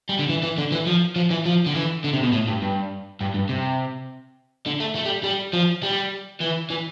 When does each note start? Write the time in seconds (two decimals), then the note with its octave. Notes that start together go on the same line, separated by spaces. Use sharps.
0.09 G3
0.19 D3
0.29 E3
0.43 E3
0.58 D3
0.72 E3
0.87 F3
1.16 F3
1.31 E3
1.46 F3
1.66 D3
1.75 E3
2.04 D3
2.13 C3
2.23 B2
2.33 A2
2.48 G2
2.62 G2
3.21 G2
3.34 G2
3.49 C3
4.67 D3
4.80 A3
4.96 A3
5.05 G3
5.24 G3
5.53 F3
5.83 G3
6.40 E3
6.70 E3